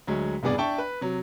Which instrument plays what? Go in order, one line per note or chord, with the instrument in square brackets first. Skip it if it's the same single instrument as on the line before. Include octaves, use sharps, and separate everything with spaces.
[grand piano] D2 F#3 G#3
E1 C2 G2 B3 G#4 D5
D4 E5 G5 A5 C#6
B4
C3 F#3